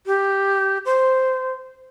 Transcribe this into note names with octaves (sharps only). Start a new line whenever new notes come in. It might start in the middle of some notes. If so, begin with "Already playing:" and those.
G4
C5